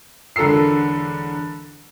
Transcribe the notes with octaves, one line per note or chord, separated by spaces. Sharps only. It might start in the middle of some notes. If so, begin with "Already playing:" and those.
E1 D3 A4 A#4 E6 C7